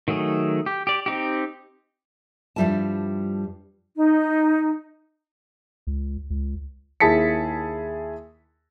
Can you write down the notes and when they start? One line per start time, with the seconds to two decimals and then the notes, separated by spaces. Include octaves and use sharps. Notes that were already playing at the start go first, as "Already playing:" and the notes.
0.08 D#3 F#3 A3 G#4
0.66 G4
0.87 G4 D5
1.06 C4 D#4 G4
2.56 G2 F3 G3 E4 F4 A5
3.96 D#4
5.87 C#2
6.30 C#2
7.00 D#2 E4 G#4 A5 B6 C#7